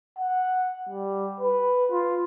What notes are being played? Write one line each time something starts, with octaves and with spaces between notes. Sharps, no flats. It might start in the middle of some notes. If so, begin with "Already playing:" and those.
F#5
G3
B4
F4